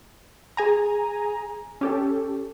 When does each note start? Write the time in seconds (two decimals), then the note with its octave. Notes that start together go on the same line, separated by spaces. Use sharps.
0.57 G#4 G#5 A#5
1.81 C#4 G4 A4